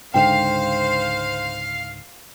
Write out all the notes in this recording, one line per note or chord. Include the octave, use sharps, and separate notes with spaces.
C#2 G#2 D3 C5 F5 G5